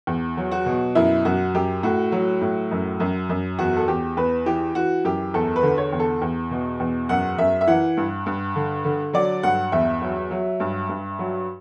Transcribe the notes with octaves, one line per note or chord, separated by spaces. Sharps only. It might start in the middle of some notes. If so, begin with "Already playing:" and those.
E2
F#3
F#4
B2
F#2 E4
F#2 F#4
F#2 G4
A2 F#4
F#3
A2
F#2
F#2
F#2
E2 F#4
A4
E2 G4
E2 B4
E3 G4
E3 F#4
F#2 G4
E2 A4
B4
D3
C#5
E2
A4
E2
B2
E2
F#2 F#5
F#2 E5
E5
E3 F#5
G2
G2
D3
D3
F#3 D5
G2 F#5
E2 E5
F#3
F#3
G2
G2
F#3